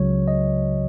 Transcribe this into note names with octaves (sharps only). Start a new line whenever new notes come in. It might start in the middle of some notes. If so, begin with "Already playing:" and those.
Already playing: C#2 C#3 F#3 C#5
D#5